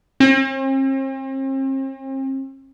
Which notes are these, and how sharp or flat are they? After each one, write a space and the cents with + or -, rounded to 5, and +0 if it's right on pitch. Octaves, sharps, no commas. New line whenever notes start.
C4 +45